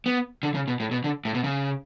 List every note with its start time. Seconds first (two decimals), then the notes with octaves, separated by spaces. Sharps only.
0.06 B3
0.43 D3
0.55 C#3
0.68 B2
0.80 A2
0.91 B2
1.04 D3
1.25 A2
1.35 B2
1.44 C#3